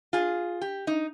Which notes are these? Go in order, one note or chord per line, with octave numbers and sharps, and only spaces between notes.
F4 G#4
G4
D#4